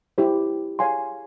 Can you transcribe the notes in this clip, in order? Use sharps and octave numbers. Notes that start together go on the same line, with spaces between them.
E4 G4 C5
G#4 C#5 F5 G#5 C6